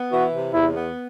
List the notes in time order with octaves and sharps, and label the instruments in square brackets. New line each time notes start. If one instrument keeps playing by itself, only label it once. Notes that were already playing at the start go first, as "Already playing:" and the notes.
Already playing: [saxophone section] B3
[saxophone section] E3 [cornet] F#4
[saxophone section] C3
[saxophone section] E2 [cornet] E4
[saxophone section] B3